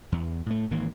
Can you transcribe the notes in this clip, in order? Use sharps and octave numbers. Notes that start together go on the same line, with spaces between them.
E2
A2 A3
G#1 D#3 E3 A#3